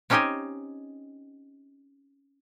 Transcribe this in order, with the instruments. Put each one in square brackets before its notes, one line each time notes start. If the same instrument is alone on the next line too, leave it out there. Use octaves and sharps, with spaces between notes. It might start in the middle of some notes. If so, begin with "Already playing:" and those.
[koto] C4 C#4 D#4 G4 D#5 G#5